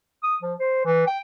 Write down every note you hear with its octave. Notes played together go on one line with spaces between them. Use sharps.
D#6
F3
C5
E3
G5